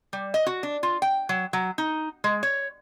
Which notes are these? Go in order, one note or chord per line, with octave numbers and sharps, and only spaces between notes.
G3
D#5
F#4
D4
F4
G5
F#3
F#3
D#4
G#3
C#5